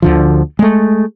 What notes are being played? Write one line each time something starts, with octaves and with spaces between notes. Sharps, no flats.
D2 D3 F3
G#3 A3